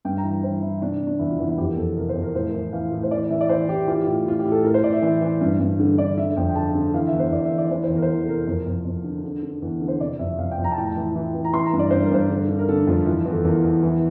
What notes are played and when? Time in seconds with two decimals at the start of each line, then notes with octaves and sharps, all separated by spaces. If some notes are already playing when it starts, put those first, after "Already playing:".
0.05 G2 G5
0.18 A#5
0.24 E3
0.31 G5
0.43 E3 C5
0.62 E3 E4
0.82 C3 D4
1.00 C3
1.07 D4
1.19 E2 E4
1.29 F4
1.38 E2 E4
1.49 E4
1.58 F2 G4
1.68 A#4
1.77 F2 A4
1.96 C3 A#4
2.09 C5
2.15 F2
2.22 A#4
2.34 A2 C5
2.49 A#4
2.54 E3
2.73 E3 F5
2.92 A2
3.03 C5
3.11 E3 D5
3.30 E3 E5
3.41 D5
3.49 E3 C5
3.68 E3 G4
3.88 E3 F4
3.95 G4
4.02 F4
4.07 A2
4.26 A2 F4
4.39 G4
4.45 A2
4.51 A4
4.64 A2 A#4
4.74 C5
4.84 A2 D5
4.93 E5
5.02 E3
5.22 E3
5.41 G2
5.60 G2
5.79 D3
5.98 D3 D5
6.18 D3 E5
6.37 F2 G5
6.49 G5
6.55 D3 A5
6.75 D3
6.94 E3 F5
7.07 E5
7.13 E2
7.19 C5
7.32 E2 D5
7.45 E5
7.51 E3
7.58 D5
7.71 E3 C5
7.84 C5
7.90 E2
7.96 A#4
8.02 C5
8.09 E3 A#4
8.24 A4
8.28 C3 A#4
8.47 F2 A#4
8.66 F2
8.85 F2
9.04 D3
9.24 D3
9.43 D3
9.62 E2
9.81 D3
9.88 C5
10.00 C3 D5
10.19 F2 E5
10.39 F2 F5
10.51 G5
10.58 F2
10.64 A#5
10.72 A5
10.78 A2 G5
10.85 A5
10.96 E3
11.15 E3
11.34 E3
11.45 A#5
11.54 E3 C6
11.66 A#5
11.73 G2
11.79 D5
11.91 G2 C5
12.03 A#4
12.11 G2 C5
12.30 D3
12.49 D3
12.59 A#4
12.69 D3 A4
12.87 F2 F4
13.06 E3 F4
13.26 E2
13.32 A4
13.45 E2 A#4
13.64 E2
13.83 E3